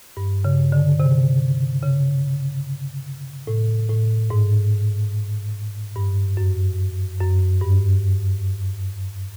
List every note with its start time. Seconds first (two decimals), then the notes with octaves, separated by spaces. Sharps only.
0.17 G2
0.45 C#3
0.72 D3
1.00 C3
1.83 C#3
3.47 A2
3.89 A2
4.30 G#2
5.96 G2
6.37 F#2
7.20 F#2
7.61 G2